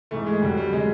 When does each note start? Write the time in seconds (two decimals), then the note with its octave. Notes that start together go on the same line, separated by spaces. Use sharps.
0.11 G#2 E3 A3
0.27 G#3
0.42 F2 D3 F#3 G3
0.57 G3
0.73 D3 F#3 G#3